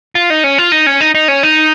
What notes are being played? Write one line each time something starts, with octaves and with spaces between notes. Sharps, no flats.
F4
D#4
C#4
F4
D#4
C#4
D#4
D#4
C#4
D#4